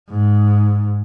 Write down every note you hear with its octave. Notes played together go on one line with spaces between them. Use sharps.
G#2